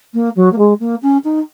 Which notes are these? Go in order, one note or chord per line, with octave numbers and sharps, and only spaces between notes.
A#3
F#3
A#3
G#3
A#3
C#4
D#4